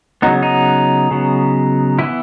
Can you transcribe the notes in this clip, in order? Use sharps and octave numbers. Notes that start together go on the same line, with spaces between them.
C#3 F#3 B3 D#4
D#4
C#3 F#3 B3
E3 B3 E4